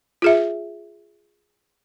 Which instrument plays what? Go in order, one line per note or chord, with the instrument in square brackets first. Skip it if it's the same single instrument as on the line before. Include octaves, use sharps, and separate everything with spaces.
[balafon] F4 G#4 E5